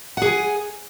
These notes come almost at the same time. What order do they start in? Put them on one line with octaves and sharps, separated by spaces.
F#5 G#4 G#5